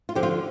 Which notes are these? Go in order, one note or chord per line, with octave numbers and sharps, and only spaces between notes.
F4
D3 F3 G4
F4